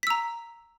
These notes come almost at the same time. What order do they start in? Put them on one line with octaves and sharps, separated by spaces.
B6 E6 A#5